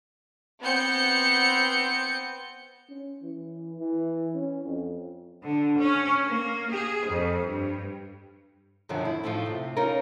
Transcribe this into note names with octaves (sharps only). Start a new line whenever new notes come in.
B3 C4 G6 C#7
C#4
E3
E3
C#4
F2
D3
C#4
A#3
G#4
F2
G2
F#2 B2 D3 D#3 F3
E4
A2 F3 A3 C4 D#4 F4
C3
C#4 D#4 F4 A#4